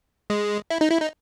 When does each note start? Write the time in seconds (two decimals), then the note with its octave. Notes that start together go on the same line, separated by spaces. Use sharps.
0.30 G#3
0.70 E4
0.81 D#4
0.90 E4
1.00 D#4